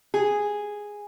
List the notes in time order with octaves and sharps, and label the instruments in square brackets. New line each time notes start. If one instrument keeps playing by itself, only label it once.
[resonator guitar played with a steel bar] G#4